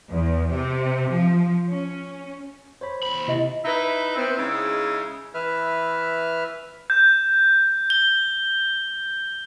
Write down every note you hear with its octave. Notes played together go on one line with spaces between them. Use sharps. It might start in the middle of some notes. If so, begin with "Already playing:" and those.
E2
C3
F3
C#4
C5 C#5 B5
D#2 C5 B5
C3 E4 D#5 E5
D#4 E4 B4 E5
B3 C4
C#3 G#3 D#4 E4
E3 B4 E5 F6
G6
G7